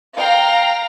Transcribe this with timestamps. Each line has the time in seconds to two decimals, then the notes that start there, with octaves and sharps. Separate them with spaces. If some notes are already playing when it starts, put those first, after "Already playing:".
0.16 F5 G5 A#5